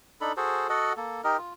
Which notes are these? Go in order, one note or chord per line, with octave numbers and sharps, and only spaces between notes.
D4 D#4 A4 B5
F#4 G#4 A4 C5
F#4 A4 D#5 F#5
A#3 A4
D#4 G4 A#4 D#5
F4